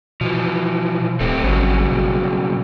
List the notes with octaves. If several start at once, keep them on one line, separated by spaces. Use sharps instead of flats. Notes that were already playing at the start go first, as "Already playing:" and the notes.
B2 E3 F3
D1 A3 C4 G4
G#1 G2 C#3 F#3
B2